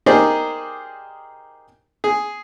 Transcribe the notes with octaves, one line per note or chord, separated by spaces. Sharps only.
D#4 G4 G#4 A#4 C5 D5
G#4